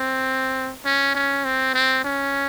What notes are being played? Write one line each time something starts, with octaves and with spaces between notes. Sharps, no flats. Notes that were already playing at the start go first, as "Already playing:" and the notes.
Already playing: C4
C#4
C#4
C4
C4
C#4